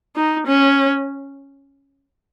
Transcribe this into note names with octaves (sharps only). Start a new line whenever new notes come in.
D#4
C#4